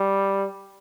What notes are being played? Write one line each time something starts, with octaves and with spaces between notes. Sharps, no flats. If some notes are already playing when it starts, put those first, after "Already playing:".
Already playing: G3